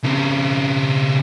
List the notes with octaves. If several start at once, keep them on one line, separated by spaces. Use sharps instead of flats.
C#3 C4